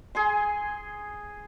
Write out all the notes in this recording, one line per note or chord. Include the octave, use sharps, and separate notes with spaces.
G#4 G#5 C6